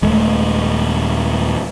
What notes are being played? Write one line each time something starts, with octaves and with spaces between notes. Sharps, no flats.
D#1 G#3 A3